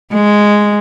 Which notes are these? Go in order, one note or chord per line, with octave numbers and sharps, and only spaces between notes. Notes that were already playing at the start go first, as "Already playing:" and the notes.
G#3